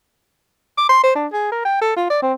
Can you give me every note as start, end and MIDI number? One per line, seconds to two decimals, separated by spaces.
0.78 0.89 86
0.89 1.02 84
1.03 1.13 72
1.15 1.27 62
1.33 1.51 68
1.52 1.62 70
1.65 1.79 79
1.81 1.95 69
1.97 2.08 65
2.10 2.18 74
2.22 2.33 60